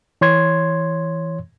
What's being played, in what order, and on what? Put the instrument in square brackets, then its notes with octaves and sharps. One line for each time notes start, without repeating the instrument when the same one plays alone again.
[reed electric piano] E3 C#5 C6 G#6